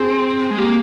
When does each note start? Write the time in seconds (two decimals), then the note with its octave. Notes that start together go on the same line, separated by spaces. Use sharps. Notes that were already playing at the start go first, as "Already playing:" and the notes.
Already playing: C4 G#4
0.51 G#3
0.58 A#3 G4